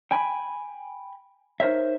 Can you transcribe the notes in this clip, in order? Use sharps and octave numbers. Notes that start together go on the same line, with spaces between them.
G5 G#5 B5
D#4 A#4 C5 C#5 E5